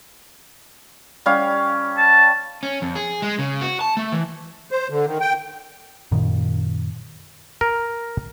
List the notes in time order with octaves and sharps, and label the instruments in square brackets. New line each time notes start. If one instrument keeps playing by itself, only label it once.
[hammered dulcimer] G3 C#4 F5
[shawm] A5
[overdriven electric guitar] C#4
F2
G#4
G#3
C#3
F#4
A5
A3
E3
[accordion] C5
D3
D#3
G5
[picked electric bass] F#2 A#2 D#3
[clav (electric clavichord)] A#4